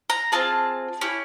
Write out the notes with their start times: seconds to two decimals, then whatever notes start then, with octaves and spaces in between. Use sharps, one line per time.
0.10 A#5
0.32 C4 F4 G#4 A5
1.01 C#4 E4 G4